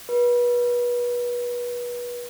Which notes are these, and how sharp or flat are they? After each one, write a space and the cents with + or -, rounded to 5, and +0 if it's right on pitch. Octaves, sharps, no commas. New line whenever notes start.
B4 -30